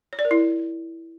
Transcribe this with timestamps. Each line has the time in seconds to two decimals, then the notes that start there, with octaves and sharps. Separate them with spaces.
0.13 C#5
0.19 D5
0.25 A#4
0.31 E4